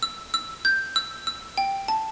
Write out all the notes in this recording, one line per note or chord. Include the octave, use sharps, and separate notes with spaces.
E6
E6
G6
E6
E6
G5
A5